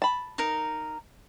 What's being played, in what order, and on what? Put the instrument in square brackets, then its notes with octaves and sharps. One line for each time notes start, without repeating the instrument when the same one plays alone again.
[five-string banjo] A5 B5
[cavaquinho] D#4 A#4